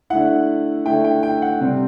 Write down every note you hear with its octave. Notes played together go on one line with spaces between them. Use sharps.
D3 A3 E4 F#5
D3 A3 E4 G5
G5
G5
F#5
C3 G3 C4